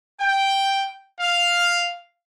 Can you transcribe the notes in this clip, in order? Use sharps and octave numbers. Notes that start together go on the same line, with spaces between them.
G5
F5